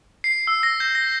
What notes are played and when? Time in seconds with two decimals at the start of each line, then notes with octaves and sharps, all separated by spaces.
0.24 C7
0.47 E6
0.63 A#6
0.80 G6
0.95 A#6